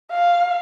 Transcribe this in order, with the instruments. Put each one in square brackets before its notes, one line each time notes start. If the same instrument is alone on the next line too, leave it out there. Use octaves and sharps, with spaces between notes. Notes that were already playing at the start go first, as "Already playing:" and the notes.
[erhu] F5